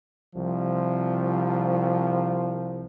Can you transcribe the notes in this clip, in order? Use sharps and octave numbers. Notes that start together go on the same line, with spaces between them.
C2 F3